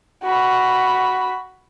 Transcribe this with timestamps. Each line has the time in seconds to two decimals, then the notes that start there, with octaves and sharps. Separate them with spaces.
0.23 F#4 B5